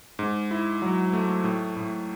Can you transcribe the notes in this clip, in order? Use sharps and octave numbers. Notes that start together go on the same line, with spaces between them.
G#2
E4
F#3
A3
A2
A2